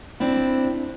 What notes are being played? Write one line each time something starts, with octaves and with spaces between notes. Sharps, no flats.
C4 D4 E4